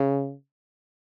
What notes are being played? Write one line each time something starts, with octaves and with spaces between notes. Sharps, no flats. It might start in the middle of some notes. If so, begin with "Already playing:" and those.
Already playing: C#3